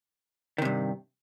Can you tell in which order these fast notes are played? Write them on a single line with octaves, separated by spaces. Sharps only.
D#3 C3 G2